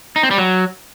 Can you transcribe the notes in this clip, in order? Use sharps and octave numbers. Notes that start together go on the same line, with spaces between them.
D#4
C4
G3
F#3